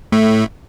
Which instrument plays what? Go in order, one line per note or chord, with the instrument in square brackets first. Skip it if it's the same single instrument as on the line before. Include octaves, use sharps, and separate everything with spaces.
[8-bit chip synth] A2 A3